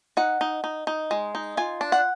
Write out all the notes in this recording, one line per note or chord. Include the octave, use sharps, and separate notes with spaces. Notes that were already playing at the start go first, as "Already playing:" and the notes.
D#4 F#5
D#4
D#4
D#4
G#3
D#4
F4 G#5
D4
F#5